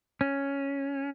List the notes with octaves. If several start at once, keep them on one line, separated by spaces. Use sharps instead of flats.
C#4